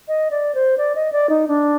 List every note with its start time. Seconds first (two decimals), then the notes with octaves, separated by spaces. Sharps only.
0.08 D#5
0.31 D5
0.55 C5
0.78 D5
0.95 D#5
1.12 D5
1.29 D#4
1.48 D4